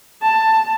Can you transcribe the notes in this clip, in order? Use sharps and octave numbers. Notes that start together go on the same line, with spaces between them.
A5